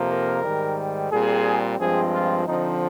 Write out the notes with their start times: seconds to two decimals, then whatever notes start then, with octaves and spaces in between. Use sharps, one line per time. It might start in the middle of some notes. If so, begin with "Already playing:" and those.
Already playing: F2 C3 F3 A#3
0.10 A#4
0.44 G#2 D#3 G3
1.12 A#2 G3 C4 G#4
1.80 G2 F3 G#3 C4 G#4
2.13 F4
2.47 D3 F3 C4 D#4